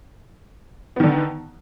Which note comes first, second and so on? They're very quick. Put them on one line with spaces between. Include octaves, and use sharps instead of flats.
B3 D#3 D3